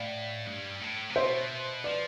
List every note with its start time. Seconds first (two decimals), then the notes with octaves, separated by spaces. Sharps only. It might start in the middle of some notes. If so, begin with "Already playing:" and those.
Already playing: A2 D5 F5
0.47 G2
0.81 A2
1.10 C3
1.15 B2 C5 E5
1.84 F3 B4 D5